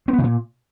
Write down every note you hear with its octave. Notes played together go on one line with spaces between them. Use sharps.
C4
B3
D3
A#2